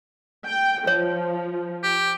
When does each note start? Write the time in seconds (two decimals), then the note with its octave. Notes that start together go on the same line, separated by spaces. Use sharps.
0.49 G5
0.87 F3 C#5
1.83 G4